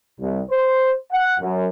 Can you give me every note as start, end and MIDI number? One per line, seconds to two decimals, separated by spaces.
0.19 0.40 36
0.51 0.92 72
1.12 1.35 78
1.40 1.67 42